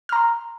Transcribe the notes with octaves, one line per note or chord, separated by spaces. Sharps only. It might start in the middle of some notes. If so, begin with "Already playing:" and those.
A#5 C6 F6